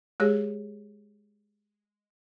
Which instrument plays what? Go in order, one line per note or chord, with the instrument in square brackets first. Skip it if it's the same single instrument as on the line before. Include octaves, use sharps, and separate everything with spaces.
[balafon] G#3 G4 G#4 C#5